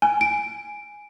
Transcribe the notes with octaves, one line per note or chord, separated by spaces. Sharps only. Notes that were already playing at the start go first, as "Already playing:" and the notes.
G#5
D7